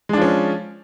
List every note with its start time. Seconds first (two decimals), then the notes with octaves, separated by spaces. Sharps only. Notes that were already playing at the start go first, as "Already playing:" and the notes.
0.09 G#3
0.13 D4
0.17 F3
0.22 C#4